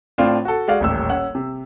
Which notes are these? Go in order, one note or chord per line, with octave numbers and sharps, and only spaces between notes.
A2 C4 D4 F4
F#4 A4
G#3 F#4 D5 F5
D#1 A1 E6
C#4 F#5
C3